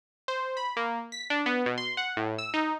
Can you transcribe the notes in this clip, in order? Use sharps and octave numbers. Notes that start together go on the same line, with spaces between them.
C5
B5
A#3
B6
D4
B3
B2
C6
F#5
A2
E6
D#4